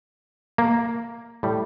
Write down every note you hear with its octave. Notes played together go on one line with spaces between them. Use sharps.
A#3
A2 G3